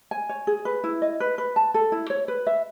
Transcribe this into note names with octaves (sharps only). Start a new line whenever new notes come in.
G#5
C#5
G#4
B4
E4
D#5
B4
B4
A5
A4
E4
C#5
B4
E5